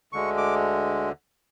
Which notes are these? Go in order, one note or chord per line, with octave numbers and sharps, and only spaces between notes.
D2 D3 G#3 C#6
D6